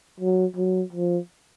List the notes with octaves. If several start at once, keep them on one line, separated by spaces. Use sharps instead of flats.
F#3
F#3
F3